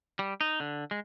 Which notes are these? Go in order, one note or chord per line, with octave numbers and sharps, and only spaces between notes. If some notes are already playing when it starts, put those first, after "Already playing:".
G3
D#4
D3
G#3